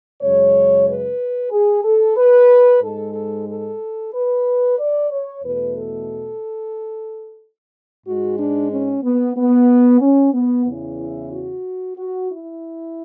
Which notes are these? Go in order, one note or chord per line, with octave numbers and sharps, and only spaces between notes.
F#2 C#3 G#3 C#5
B4
G#4
A4
B4
G#2 G#3 A4
A4
A4
B4
D5
C#5
E2 B2 A3 B4
A4
G#2 G#3 F#4
D4
C#4
B3
B3
C#4
B3
E2 C#3 E3
E4
F#4
F#4
E4